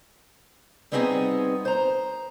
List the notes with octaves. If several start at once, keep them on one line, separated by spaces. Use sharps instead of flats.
G3 B3 C4 D#4 G4 G#4
C5 A#5